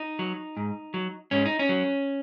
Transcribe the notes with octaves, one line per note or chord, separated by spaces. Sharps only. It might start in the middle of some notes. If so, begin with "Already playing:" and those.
Already playing: D#4
F#3
G#2
F#3
G#2 C#4
D#4
C#4
F#3